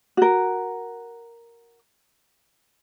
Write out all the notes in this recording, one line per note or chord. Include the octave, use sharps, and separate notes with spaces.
F#4 A#4